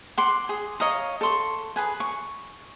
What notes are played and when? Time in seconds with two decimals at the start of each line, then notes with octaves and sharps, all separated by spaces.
0.17 F#5 C6 D6
0.49 G#4
0.80 C#5 D#5 F5 A#5
1.21 A4 C6 C#6
1.76 G#4 B4 G#5
2.00 C#6